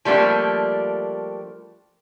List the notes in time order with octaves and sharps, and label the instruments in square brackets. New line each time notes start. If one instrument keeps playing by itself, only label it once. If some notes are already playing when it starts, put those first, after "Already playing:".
[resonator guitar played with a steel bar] F3 G3 A3 A#3 D4